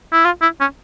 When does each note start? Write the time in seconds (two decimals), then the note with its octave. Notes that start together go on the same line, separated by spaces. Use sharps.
0.13 E4
0.25 F4
0.42 E4
0.60 C#4